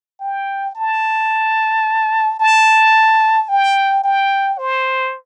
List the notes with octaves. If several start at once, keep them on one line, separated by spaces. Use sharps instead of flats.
G5
A5
A5
G5
G5
C5